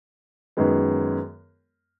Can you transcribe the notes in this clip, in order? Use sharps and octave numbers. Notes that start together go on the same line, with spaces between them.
F#2 D#3 G#3 B3